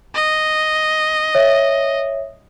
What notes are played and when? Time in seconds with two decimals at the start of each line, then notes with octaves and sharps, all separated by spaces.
0.14 D#5
1.35 C#5 E5